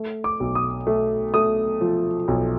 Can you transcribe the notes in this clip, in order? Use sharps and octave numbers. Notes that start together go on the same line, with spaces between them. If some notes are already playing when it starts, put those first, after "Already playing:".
Already playing: A3
D6
B1
D#6
A3
A3 D#6
F3
B1